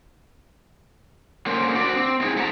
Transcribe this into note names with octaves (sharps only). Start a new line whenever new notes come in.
D3 A#3 C#4 C5
D4 F#4 C5 D5
C4
C4 D#4 E4 G4 G#4
A2 A3 F#5 G5 A5 A#5